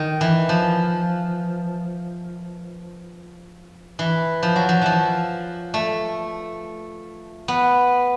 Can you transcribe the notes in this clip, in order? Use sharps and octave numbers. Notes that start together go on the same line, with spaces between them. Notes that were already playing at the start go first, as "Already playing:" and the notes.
Already playing: D#3
E3
F3
E3
F3
F#3
F3
E3 F3
A3
B3